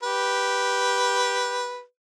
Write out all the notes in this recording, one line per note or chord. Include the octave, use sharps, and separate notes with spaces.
G4 B4